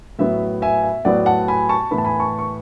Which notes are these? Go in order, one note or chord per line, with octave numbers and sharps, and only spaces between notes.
A2 F#3 B3 E5
E5 G#5
E5
A2 F#3 B3 D5 F#5
F#5 A5
G#5 B5
A5 C#6
A2 E3 B3 B5
A5
G#5 B5
A5 C#6
C#6